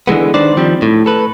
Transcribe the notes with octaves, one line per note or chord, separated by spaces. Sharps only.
D3 E3 G#3 B3
D#3 D4 B4 C5 D5
D#3 F3 G3 C4
A2
A4 B4